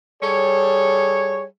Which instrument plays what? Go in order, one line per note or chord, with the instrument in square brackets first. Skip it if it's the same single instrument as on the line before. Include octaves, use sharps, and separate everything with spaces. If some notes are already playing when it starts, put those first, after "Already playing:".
[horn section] G3 G#4 A4 C#5